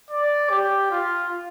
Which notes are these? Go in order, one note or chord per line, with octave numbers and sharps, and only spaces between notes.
D5
G4
F4